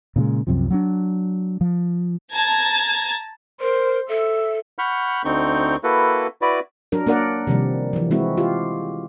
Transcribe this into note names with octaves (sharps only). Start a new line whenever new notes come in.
A#2 C#3 E3 G#3
C2 F#2 C3 F3
F#3 C4 D4
F3
A5 A#5 G#6
A#4 C5
A4 E5
F#5 B5 C#6 F6 G6
D2 D3 C4 D#4 C#6 G6
A#3 E4 F#4 A4 B4
E4 F#4 B4 D5
F#3 D4 A#4
A#3 D4 A#4 D5 F#5
C3 D#3 F3 G3
E3 F3
F3 G#3 C4 E4 F#4
F4 G4